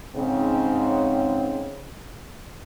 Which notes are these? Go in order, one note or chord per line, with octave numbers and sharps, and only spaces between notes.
G#2 C#3 C4